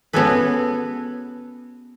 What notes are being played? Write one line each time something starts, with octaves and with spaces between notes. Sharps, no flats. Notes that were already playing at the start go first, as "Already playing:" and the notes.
B3 C#4 F#4 G#4 A4 B4